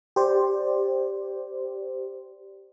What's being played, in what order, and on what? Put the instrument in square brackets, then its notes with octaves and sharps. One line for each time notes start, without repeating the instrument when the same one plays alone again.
[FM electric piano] G4 C5 D5